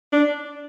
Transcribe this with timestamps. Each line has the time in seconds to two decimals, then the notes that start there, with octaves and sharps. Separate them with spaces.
0.13 D4